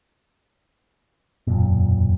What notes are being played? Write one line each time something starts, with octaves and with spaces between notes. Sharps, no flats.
E1 F#2 A#2